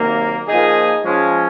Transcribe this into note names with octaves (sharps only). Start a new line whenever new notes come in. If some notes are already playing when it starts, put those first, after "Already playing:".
Already playing: C3 D#3 F#3 A#3
A#2 F3 A#3 D#4 G#4
F3 G#3 C#4